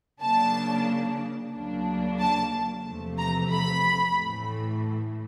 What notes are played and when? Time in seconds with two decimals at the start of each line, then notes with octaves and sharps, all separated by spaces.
0.21 C#3 F#3 A#3 D4 A5
1.53 D2 C#3 F#3 A#3 D4
2.19 A5
2.85 E2 C3 F3 A3
3.18 A#5
3.51 B5
4.17 A2 E3 A3